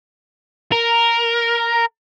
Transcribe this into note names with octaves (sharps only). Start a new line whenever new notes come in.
A#4